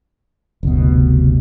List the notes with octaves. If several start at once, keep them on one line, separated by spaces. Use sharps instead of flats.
F#1 D2 B2
C3